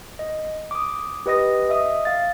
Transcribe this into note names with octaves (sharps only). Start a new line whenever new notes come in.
D#5
D6 D#6
G4 B4 D#5 D#6 A#6
D#5 E5 D#6
F5 A6